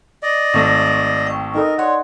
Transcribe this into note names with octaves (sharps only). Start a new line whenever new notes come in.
D5 D#5
G#1 A3 C#6 A#6
G5 C#6
D#4 A4 A#4 D#5
C#5 D5 F#5 C6